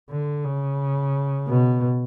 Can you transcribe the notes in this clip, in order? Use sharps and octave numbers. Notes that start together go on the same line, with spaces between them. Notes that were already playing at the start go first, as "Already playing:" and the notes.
D3
C#3
B2